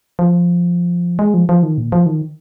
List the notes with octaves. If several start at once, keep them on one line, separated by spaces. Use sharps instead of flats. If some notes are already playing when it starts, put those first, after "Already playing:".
F3
G#3
F3
F3
D#3
A#2
F3
D#3